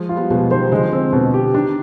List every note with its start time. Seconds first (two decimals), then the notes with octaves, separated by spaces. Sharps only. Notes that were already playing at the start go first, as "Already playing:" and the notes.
Already playing: F3 G#3
0.09 F4
0.16 G3 B3
0.30 B2 F3 G#3
0.50 D#3 G3 C5
0.71 D3 F3 G#3
0.92 C4
1.13 B2
1.34 G4
1.54 D#3 D4